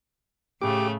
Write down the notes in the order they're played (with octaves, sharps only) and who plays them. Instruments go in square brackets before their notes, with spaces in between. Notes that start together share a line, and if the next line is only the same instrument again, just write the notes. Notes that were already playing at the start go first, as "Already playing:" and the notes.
[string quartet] A2 C#3 A3 [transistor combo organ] G4 D6